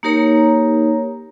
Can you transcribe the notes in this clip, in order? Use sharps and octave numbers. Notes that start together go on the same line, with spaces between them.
A#3 D#4 G4 A#4 C#5 A#5